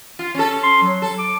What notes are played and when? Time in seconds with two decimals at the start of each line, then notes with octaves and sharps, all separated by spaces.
0.19 F4
0.35 C#4 A4
0.63 C6
0.82 F#3
1.02 A4
1.18 D6